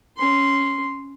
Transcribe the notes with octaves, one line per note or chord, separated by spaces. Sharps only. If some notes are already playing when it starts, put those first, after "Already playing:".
C#4 C6